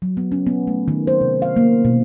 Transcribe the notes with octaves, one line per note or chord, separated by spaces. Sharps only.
F#3
B3
C#4
B3
A3
D#3
C5
C3
F5
A#3
B2